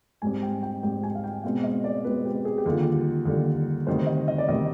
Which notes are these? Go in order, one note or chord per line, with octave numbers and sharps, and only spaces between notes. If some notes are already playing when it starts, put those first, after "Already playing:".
G#2 G3 C4 G#5
G5
G5
G#2 G3 C4 G5
G#5
F5
G5
B2 G#3 C4 F5
D#5
D5
B2 G#3 C4 B4
G4
G#4
G4
D#2 D3 G3 F4
G4
D#2 D3 G3
D2 C3 D#3 G3 C5
D#5
D#5
D5
D2 C3 D#3 G3 D#5